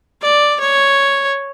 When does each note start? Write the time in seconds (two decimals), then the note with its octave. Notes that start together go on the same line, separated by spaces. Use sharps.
0.22 D5
0.60 C#5